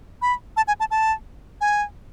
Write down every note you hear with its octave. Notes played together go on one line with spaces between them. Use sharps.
B5
A5
G#5
A5
A5
G#5